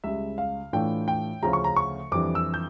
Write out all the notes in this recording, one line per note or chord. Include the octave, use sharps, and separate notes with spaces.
C#2 C#3 G3 E5
F5
A2 E3 A3 D4 F4 G5
G5
D2 C#3 F3 C#4 F4 A#5
C#6
A#5
C#6
F2 E3 G3 D4 D6
E6
G6